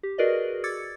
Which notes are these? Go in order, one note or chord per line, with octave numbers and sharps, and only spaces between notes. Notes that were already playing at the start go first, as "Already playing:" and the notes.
G4
F#4 G#4 A#4 B4 D5 D#5
D6 E6 G#6 A6 C#7